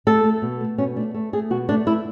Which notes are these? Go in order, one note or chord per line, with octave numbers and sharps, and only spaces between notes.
A3 A4
A3
B2
A3
B2 C#4
A3 D4
A3
A3 G#4
B2 F#4
A3 D4
A3 E4